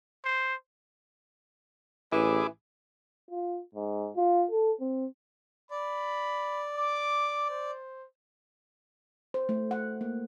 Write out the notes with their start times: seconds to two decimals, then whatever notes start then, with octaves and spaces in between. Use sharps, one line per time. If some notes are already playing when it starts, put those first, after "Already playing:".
0.25 C5
2.12 A1 E3 E4 G#4 D6
3.30 F4
3.75 G#2
4.16 F4
4.51 A4
4.80 C4
5.71 D5 B5
6.77 D6
7.50 C5
9.34 C5
9.49 A3
9.71 F#5
10.01 A#3